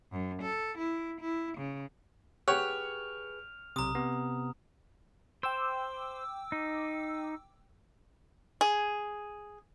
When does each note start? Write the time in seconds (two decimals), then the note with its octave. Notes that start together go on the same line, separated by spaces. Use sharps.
0.12 F#2
0.42 A4
0.78 E4
1.20 E4
1.58 C#3
2.48 G4 G#4 B4 C#5 F#5 F6 F7
3.76 B1 C3 A#5 D#6
3.95 C3 B3
5.43 C5 G5 D6 E6
6.52 D#4
8.61 G#4